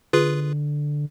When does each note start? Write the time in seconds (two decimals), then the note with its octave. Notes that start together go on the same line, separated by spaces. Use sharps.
0.13 D3 F4 G#4 B4